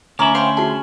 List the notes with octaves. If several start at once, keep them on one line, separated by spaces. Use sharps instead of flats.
D2 C#4 E4 A#5 D6
C5 F5 G5
F#4 G#4 A5 C6